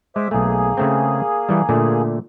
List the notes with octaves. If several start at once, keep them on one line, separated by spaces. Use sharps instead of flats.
G#3 C5 E5 D6
B1 A3 A#3 G#4
C#3 A3 C4
E3 G3
A#2 D3 A3